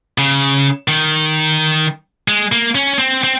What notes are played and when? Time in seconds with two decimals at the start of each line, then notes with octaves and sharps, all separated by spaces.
0.18 C#3
0.88 D#3
2.28 G#3
2.52 A#3
2.75 C#4
2.99 C4
3.24 C4